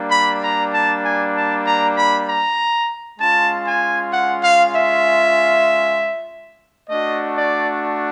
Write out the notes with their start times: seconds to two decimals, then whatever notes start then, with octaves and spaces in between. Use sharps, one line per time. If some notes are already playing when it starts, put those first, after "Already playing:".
Already playing: G3 A#3 D4
0.10 B5
0.42 A#5
0.73 A5
1.03 G#5
1.35 A5
1.65 A#5
1.96 B5
2.27 A#5
3.19 G#3 C#4 F4 A5
3.66 G#5
4.12 F#5
4.43 F5
4.74 E5
6.90 A3 D4 F#4 D#5
7.35 D5